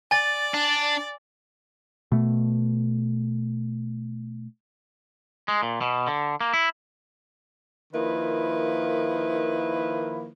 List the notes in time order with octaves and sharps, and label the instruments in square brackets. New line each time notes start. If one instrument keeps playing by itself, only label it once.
[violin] D5 [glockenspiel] G#5 A6
[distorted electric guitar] D4
[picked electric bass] B2 A3
[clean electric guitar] G#3
A#2
B2
D3
A#3
E4
[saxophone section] D#3 F3 A#3 E4 B4